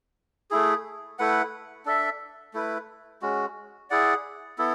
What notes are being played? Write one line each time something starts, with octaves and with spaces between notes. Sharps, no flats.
A3 E4 G#4
A3 E4 B4 F#5
D4 A4 E5
A3 E4 B4
G#3 C#4 F#4
E4 G#4 D5 F#5
B3 E4 A4